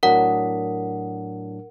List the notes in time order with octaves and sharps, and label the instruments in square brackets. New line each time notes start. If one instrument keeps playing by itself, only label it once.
[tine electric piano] A2 F#3 D4 [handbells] A#4 F#5